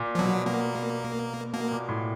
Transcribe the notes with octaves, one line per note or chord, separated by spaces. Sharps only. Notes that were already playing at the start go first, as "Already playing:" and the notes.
Already playing: A#2
F3
B2 F#3
B2 A#3
B2 A#3
A#2
A2